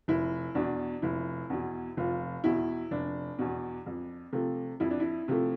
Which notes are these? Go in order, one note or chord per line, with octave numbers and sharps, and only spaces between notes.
F1 E4
E2 B2 D4
F1 E4
E2 B2
F1 F3 F4
E2 B2 E4
F1 D4
E2 B2
F2
C3 F3 A3
F2 E4
D4
E4
C3 F3 A3